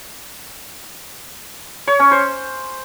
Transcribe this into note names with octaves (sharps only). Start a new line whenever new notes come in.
C#5
C#4
C5